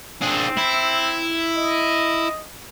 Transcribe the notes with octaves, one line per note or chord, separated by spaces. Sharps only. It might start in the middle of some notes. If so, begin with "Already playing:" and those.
C4 D4 G#4
E4
D#5